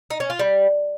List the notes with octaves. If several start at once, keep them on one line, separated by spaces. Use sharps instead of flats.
D#4
C#4
F4
G3